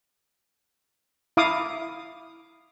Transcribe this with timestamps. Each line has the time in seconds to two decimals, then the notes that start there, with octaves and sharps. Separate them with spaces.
1.37 E4 F5 D6 D#6